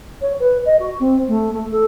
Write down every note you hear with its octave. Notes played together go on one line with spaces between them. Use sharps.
C#5
B4
D#5
F#4
C4
A3
A3
A4